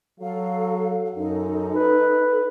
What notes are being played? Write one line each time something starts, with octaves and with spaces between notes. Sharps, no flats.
F#3 A4 F5
F#2 D#4 A4
B4